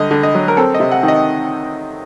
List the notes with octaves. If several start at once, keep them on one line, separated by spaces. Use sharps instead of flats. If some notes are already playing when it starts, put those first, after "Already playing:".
Already playing: D3 G3 D#5
D3
D#5
F#3
A#4
C4 A4
D#5
C3
F#5
D#3
D#5